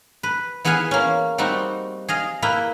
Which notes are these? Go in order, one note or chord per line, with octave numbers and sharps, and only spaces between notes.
B4
E3 B3 G#4 B4 F5 G#5
A#3 C#4
G3 C4 D#4 F#4
G#4 D#5 F5
A#3 E4 B4 G5